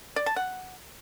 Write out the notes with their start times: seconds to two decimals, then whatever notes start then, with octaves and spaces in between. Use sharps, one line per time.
0.16 D5
0.26 A5
0.36 F#5